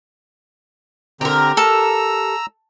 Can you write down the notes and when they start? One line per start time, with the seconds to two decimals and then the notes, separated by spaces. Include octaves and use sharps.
1.21 D3 C4 G4 A#4 A#5
1.57 A4 A#5 E6